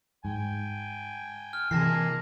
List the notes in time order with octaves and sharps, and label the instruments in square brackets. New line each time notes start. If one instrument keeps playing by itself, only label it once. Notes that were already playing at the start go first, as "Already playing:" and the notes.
[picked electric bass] G#2 [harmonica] G5 G#5
[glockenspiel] F6
[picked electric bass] C3 E3 [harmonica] G#3 A#3 G#5 [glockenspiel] A5 A#6 C7